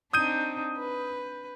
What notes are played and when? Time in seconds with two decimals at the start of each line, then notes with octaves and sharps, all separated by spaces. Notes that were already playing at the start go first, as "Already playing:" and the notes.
0.13 C4 D4 D#4 D#6 G6 D#7
0.78 B4